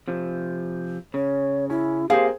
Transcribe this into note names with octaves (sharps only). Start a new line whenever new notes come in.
C3 F3
C#3 C#5
C#4 E4
A#3 C4 G4 G#4 C5 F5